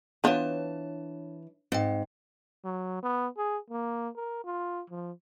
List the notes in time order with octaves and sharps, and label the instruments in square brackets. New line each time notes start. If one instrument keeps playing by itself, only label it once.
[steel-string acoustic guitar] E3 A5 [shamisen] B3 F4 [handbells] D4 C#5
[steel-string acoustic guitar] G#2 [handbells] C4 G5
[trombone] F#3
B3
G#4
A#3
A#4
F4
F3